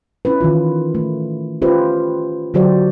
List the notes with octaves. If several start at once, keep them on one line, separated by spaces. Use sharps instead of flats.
C#4 E4 B4
D#3 E3 F4
A3
C#4 F4 G4 B4 C5
D3 F#3 F#4 G4 C5 D5